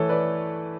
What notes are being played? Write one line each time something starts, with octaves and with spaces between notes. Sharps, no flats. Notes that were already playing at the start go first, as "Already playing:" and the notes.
Already playing: E3 A3 A4 C#5
B4 D5